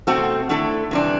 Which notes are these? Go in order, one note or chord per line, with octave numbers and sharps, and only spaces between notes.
B2 A3 C4 F#4 A4
D3 A3 E4 A4
C3 E3 G3 D4